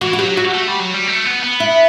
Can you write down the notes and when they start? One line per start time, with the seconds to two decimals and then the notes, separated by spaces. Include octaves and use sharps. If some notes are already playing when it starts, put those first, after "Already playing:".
0.01 E3 F#4
0.13 F#4
0.19 F#3 G4
0.37 F#4
0.54 A3
0.68 G3
0.80 F#3
0.93 G3
1.07 A3
1.25 B3
1.43 B3
1.60 E4